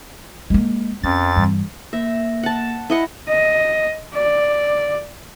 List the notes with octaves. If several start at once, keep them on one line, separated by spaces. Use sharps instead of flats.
G#3 A#3
F2 C#4 A6
G2 E3
A#3 E5 A#6
F#5 A5
E4 D#5 F#5
D#5
D5